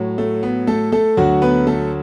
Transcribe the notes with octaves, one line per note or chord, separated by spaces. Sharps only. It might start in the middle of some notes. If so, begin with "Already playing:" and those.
Already playing: A2 F#3
A3
B3
A3 A4
A3 A4
D2 D3 F#3 F#4
B3 B4
A3 A4